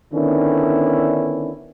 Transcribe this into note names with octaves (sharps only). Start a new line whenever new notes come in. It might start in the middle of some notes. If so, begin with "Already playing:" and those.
D3 D#3 B3 C#4 D4 E4